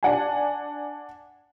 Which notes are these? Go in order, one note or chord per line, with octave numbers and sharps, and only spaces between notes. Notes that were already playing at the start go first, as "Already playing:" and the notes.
D4 F#5 G#5